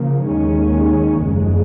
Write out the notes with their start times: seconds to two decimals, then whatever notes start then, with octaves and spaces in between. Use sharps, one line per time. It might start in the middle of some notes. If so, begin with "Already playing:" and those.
Already playing: C#3 F3 A#3
0.26 D#2 D#3 G#3 C#4
1.22 F#1 F2 C#3 G#3